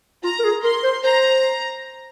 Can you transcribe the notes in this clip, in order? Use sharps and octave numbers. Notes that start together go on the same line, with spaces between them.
F4 A#5
A#4
G#4
A#4 C6
C5
C5 A#5